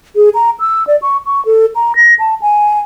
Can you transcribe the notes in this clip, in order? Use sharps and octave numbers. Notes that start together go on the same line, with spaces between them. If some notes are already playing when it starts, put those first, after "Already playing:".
G#4
A#5
E6
D5
C#6
C#6
A4
A#5
A#6
A5
G#5